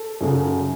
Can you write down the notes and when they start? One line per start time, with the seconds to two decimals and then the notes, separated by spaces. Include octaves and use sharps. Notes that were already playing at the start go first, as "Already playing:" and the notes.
Already playing: A4
0.21 F#2 C#3 F#3